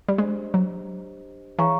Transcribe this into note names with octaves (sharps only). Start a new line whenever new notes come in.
G3
G#3 D4 G4 C5 D#5
F#3
E3 G#4 C#5 F5 A#5 C#6